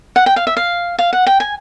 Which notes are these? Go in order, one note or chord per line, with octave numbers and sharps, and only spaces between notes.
F#5
G5
F5
E5
F5
F5
F#5
G5
G#5